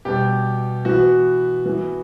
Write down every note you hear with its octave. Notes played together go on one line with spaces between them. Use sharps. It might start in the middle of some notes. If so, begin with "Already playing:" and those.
B2 G3 B3 G4
E3 B3 F#4
E3 B3